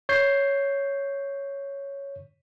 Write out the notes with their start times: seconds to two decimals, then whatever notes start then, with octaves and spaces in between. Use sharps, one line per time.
0.09 C#5 G6 C7